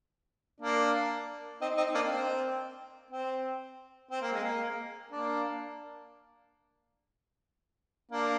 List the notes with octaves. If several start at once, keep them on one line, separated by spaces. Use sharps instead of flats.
A#3 D4
C4 D#4
C4 D#4
A#3 D4
C4
C4
C4
A#3
G#3
A#3
A#3 D4
A#3 D4